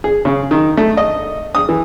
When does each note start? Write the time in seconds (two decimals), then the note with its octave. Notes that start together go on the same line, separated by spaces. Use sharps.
0.04 G#4
0.25 C#3
0.51 D#3
0.77 A3
0.97 D#5
1.55 D#6
1.69 E3